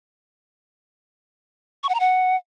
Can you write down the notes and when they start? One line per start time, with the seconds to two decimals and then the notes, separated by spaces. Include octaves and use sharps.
1.83 C#6
1.89 F#5
1.94 A#5
2.00 F#5